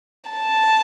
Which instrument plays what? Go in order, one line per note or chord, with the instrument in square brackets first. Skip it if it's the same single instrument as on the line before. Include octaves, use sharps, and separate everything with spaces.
[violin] A5